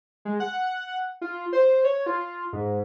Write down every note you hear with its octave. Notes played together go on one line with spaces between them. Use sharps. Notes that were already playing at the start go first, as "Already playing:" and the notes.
G#3
F#5
F4
C5
C#5
F4
G#2